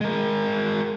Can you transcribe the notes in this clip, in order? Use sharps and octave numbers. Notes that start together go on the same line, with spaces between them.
G#3 A#4